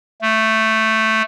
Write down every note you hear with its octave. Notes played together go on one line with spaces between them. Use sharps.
A3